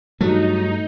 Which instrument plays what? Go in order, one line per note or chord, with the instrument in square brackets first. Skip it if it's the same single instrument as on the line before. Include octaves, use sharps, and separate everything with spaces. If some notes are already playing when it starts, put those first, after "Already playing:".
[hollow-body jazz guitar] G2 [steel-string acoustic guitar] F#3 [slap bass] A3 [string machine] D#4